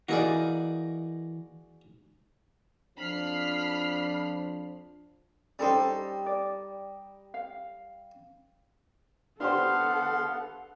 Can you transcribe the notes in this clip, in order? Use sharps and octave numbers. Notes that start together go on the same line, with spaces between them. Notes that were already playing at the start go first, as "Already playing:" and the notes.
E3 A#3 D#4 F#4 G#4 D5
F2 F3 D4 B5 F6 C7
G3 C#4 D#4 A4 C5
D5
F5
B3 D4 G4 A4 C5 F5 F#5 C6